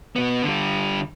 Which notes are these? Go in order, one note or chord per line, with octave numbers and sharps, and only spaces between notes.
B2 B3
D3 G3